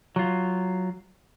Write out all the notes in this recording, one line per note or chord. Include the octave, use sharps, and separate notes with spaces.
F#3 F4